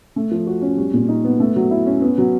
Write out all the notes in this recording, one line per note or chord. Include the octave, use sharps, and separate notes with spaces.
A3
F3
F#4
C#4
G3
A#2
D#4
B3
A3
F#3
E4
C#4
B3
F#3